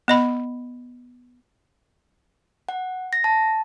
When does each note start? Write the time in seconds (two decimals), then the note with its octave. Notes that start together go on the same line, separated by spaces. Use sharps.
0.08 B3 D#5 B5
2.69 F#5
3.13 A#6
3.24 A5